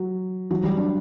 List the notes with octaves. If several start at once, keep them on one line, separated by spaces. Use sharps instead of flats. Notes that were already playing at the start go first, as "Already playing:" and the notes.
Already playing: F#3
F#3
G3
D4